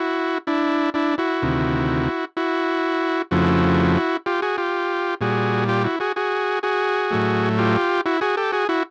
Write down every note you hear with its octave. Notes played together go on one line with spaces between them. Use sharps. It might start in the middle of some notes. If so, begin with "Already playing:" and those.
Already playing: E4 F#4
D4 E4
D4 E4
E4 F#4
D2 C3 D#3
E4 F#4
F2 C#3 F3 A3 E4 F#4
F4 G4
F#4 G#4
F4 G4
A#2 G3 F#4 G#4
F4 G4
E4 F#4
F#4 G#4
F#4 G#4
F#4 G#4
A2 F#3 A3
F4 G4
E4 F#4
F#4 G#4
G4 A4
F#4 G#4
E4 F#4